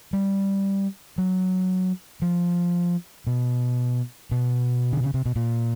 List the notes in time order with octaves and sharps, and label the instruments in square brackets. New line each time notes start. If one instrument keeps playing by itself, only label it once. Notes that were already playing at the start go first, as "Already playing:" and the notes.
[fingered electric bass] G3
F#3
F3
B2
B2
D3
C#3
C3
B2
A#2